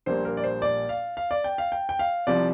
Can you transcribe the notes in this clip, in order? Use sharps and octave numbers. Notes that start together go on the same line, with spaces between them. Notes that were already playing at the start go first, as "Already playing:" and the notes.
A#1 A#2 G3 A#3 C5
A#4
D5
C5
D5
F5
F5
D5
G5
F5
G5
G5
F5
C2 C3 F3 D5